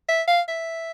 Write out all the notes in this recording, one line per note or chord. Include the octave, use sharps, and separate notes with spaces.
E5
F5
E5